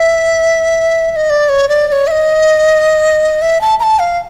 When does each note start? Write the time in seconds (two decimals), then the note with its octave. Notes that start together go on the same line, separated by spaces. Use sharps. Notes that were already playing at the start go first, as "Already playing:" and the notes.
Already playing: E5
1.11 E5
1.16 D#5
1.30 D5
1.49 C#5
1.69 D5
1.88 D5
1.92 C#5
2.07 E5
2.11 D#5
3.42 E5
3.61 A5
3.80 A#5
3.83 A5
3.99 F5